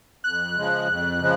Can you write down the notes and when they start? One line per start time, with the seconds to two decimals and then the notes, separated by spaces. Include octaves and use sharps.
0.24 F2 F#6
0.56 C#3 F3 G#3
0.88 F2
1.20 C#3 F3 G#3